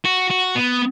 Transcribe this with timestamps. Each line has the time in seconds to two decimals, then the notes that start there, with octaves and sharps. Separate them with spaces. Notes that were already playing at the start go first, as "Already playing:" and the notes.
0.05 F#4
0.31 F#4
0.56 B3